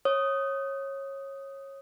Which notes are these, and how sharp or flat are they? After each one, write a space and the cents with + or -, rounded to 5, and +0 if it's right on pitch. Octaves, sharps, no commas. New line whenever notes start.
C#5 -20 D#6 +0